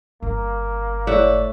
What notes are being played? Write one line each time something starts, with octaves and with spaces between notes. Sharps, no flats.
G1 A#3
A2 D5 E5 F#5